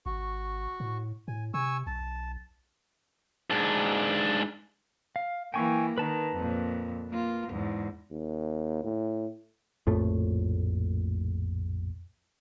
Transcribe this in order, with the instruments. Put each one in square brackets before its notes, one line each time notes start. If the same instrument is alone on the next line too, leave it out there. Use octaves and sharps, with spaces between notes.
[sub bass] G#1 [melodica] F#4 C#6
[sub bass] A2
[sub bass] A2 [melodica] G#5
[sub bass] C3 [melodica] G#5 C#6 E6
[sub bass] B1 [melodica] A5
[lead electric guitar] G#2 D4
[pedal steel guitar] F5
[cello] E3 A#3 [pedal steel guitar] G5 G#5 C#6
[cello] D#3 [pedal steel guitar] B4 A5 A#5
[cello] F2 A#2
A#3 F4
E2 G#2
[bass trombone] D#2
A2
[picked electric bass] A#1 F2 A2 A3